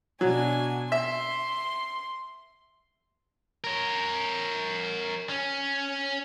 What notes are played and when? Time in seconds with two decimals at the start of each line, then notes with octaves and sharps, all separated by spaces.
0.21 B2 F#3 D4 G#5
0.92 E5 C6
3.64 A#4 C#5
5.29 C#4